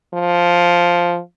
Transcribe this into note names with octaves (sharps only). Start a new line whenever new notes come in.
F3